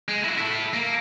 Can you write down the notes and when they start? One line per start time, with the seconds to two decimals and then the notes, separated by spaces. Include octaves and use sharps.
0.08 G#3
0.24 E4 F#4
0.38 E4 A4
0.73 A#3